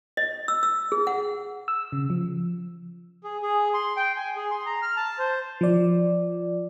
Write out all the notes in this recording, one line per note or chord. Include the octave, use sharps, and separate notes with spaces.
D#5
E6
E6
G#4
F#5
E6
C#3
F3
G#4
G#4
C6
G5
G#5
G#4
C6
A#5
F6
A5
C5
F3 D5